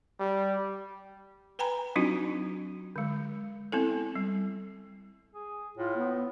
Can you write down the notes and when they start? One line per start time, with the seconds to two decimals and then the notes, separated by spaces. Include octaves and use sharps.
0.19 G3
1.59 B4 G5 G#5 A#5 B5
1.96 F#3 C4 D4 D#4 F4 F#4
2.96 D3 G#3
3.72 B3 C4 E4 A4
4.16 G3
5.34 G#4
5.77 A2 F4
5.97 B3